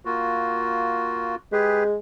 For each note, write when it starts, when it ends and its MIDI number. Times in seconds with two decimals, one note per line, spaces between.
0.05 1.35 58
0.05 1.35 65
0.05 1.35 66
1.53 1.96 56
1.53 1.84 67
1.53 1.84 68
1.53 1.84 71